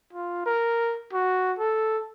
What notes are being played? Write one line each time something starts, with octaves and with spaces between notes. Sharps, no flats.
F4
A#4
F#4
A4